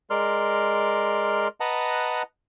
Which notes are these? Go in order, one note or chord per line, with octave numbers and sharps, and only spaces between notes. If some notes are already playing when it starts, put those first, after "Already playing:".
G#3 A#4 D5 C6 F6
B4 D#5 F#5 A5 A#5